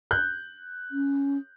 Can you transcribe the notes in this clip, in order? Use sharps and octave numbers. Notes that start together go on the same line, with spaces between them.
F#6 G6
C#4